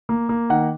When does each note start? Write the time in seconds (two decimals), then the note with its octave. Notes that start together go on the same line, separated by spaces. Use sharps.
0.09 A#3
0.29 A#3
0.50 D#3 F#5